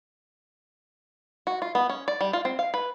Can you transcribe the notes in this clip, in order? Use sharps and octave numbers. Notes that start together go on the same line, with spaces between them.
F#4
F4
B3
C#4
D5
G3
F4
C4
F5
B4